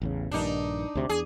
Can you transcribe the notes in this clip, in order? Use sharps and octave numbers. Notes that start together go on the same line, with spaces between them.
A1 E2 C#3
A#1 G2 D#3 D4 D#4
D2 C3
E2 G#4